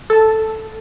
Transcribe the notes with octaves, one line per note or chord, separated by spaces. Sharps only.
A4 A5